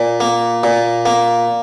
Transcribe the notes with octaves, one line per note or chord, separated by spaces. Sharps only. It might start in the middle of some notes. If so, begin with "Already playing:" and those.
Already playing: A#2
A#3
A#2
A#3